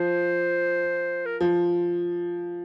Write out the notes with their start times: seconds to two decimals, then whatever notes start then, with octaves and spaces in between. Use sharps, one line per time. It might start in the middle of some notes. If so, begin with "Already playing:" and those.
Already playing: F3 C5
1.26 A#4
1.40 F3